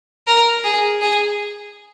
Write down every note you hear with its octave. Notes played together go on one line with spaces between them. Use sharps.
A#4
G#4
G#4